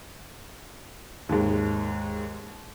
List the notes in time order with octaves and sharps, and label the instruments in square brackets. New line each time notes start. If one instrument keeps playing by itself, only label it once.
[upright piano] D#2 G#2